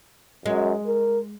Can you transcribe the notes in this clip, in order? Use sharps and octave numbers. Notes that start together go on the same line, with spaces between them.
F#2 G#3
A#4